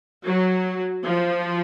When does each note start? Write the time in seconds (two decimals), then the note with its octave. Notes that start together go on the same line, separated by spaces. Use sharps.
0.24 F#3
1.04 F3